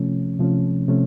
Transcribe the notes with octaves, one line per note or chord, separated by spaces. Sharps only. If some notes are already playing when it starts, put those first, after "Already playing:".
Already playing: C3 F3 A3 C#4
C3 F3 A3 C#4
C3 F3 A3 C#4